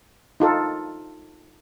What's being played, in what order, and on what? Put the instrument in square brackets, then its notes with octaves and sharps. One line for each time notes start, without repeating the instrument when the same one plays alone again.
[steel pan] D#4 F4 A4